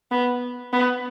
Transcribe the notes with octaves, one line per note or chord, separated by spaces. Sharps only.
B3
B3